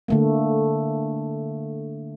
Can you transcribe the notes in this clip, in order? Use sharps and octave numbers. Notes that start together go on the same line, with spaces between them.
D3 A3 A#3